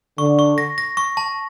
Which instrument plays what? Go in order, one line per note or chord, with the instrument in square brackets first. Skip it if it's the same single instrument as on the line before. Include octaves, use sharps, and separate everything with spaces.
[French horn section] D3 [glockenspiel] C#6
[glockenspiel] C#6
A#6
A#6
C#6
A5